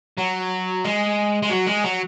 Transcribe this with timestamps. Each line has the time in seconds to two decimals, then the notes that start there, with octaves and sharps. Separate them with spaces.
0.18 F#3
0.84 G#3
1.43 G#3
1.50 F#3
1.67 G#3
1.84 F#3